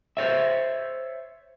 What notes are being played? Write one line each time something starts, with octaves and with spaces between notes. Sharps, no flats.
C5 C#5 E5